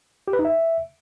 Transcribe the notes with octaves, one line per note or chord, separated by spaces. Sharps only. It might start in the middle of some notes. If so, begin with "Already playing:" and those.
G4
B4
D#4
E5